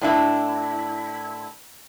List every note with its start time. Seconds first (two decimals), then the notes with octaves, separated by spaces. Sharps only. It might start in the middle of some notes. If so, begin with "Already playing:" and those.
0.01 A2 D4 E4